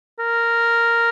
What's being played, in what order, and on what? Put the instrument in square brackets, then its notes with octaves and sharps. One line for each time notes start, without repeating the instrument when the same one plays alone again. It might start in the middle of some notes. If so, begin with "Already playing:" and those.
[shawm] A#4